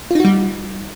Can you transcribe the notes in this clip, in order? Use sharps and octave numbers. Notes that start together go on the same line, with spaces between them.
G3 D#4 F4 F#4